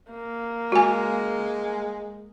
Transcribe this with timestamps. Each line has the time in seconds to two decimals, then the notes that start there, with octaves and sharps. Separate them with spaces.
0.10 A#3
0.72 G#3 F#4 G#5